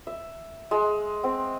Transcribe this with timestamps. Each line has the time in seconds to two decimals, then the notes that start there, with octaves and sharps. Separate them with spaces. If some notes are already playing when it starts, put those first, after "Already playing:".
0.07 E5
0.71 G#3
1.24 C4